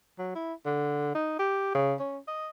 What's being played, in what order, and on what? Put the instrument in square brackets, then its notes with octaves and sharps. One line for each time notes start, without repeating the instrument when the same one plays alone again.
[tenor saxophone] F#3
E4
D3
D#4
G4
C#3
C#4
D#5